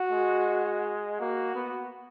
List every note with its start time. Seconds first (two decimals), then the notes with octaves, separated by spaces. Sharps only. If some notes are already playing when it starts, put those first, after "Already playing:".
Already playing: F#4
0.12 G#3
1.20 A#3 F#4
1.55 B3